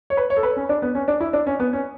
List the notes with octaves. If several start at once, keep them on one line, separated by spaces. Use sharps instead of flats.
C#5
B4
C#5
A4
B4
C#4
D4
B3
C#4
D4
E4
D4
C#4
B3
C#4